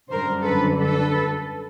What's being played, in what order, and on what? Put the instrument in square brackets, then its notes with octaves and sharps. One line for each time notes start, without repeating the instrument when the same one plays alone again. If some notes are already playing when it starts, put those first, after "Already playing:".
[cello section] F#2 D3 G3 A#4 C5
A4 B4
A4 B4